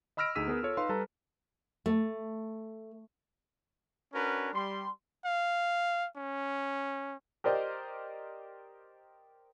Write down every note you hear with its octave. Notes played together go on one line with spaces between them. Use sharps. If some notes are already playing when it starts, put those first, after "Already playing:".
D#5 B5 E6 F6 A#6 D7
D2 D#4 G#4 E6 B6 D#7
B3 G#4 A#4 B4
F4 A4 C#5
D#4 B4 F5 C6
G3 A4 B4 A5 A#5
A3
C#4 D4 F#4 A#4 B4
G3 C6
F5
C#4
G4 A#4 C5 D5 D#5